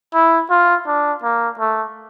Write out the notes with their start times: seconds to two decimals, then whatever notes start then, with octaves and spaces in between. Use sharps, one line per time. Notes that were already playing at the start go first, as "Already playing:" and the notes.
0.14 E4
0.50 F4
0.87 D4
1.23 A#3
1.59 A3